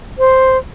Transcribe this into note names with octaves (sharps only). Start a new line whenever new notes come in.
C5